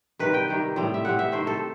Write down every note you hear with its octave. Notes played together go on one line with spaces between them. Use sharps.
C3 D#3 G3 B4
G5
C3 D#3 G3
A2 G3 C4
E5
A2 G3 C4 F#5
E5
C3 D#3 A3 C5
A4